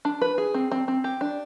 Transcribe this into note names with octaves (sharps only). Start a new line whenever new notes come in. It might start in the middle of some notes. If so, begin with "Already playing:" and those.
D4
B4
G#4
C4
C4
C4
G4
D4